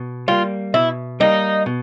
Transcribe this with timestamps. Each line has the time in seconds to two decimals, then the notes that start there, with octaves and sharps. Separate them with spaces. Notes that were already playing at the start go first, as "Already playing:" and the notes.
Already playing: B2
0.28 G3 A#3 F4
0.74 B2 E4
1.20 G3 A#3 D#4
1.66 B2